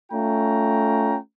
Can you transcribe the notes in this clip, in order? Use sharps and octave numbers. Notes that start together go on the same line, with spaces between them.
A3 C#4 F4 G5 A#5